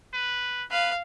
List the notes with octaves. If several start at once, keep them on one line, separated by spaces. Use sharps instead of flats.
B4
B4 F5